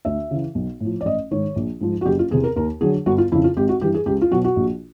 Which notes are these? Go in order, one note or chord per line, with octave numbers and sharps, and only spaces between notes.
D2 E5
C#3 E3
B1
A2 F3
D5
A1 D#5
G#2 D#3 C#5
A#1
G#2 F3
F#4
F#1 G4
F4
E2 C3 G#4
A#4
D#2 A#4
D3 F#3 G#4
G1 F#4
F4
F2 C#3 E4
F4
G#1 G4
F#4
G2 E3 G4
G#4
C#2 G4
F4
B2 F#3 F#4
F#4
A#1